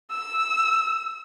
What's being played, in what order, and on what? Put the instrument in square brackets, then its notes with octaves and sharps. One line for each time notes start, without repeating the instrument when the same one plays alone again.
[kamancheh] E6